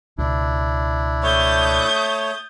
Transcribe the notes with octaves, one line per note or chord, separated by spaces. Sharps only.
C#2 B2 D4 E4
A3 C#5 D#6 G6 A6